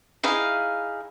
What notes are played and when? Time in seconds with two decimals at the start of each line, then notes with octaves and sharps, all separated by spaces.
0.23 D#4 E4 G#4 F5